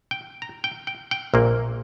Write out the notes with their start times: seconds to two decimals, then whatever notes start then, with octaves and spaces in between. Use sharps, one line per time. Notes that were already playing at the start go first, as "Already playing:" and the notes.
0.11 G5
0.42 A#5
0.64 G5
0.87 G5
1.11 G5
1.34 A#1 A#2 A#3